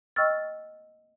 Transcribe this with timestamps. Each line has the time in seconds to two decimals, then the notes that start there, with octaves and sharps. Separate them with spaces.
0.16 D#5 G5 C#6 E6 F6 A6